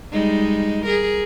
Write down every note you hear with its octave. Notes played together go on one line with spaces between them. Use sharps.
G3 G#3 D#4
G#4 A#4